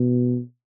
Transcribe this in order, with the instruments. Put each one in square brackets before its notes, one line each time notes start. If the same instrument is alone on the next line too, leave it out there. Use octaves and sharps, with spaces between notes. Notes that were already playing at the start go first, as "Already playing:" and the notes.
Already playing: [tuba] B2